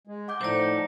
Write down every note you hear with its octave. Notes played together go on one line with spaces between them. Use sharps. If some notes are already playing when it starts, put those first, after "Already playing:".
G#3
F#5 D6 G6
A2 F3 A3 D#4 C5 D5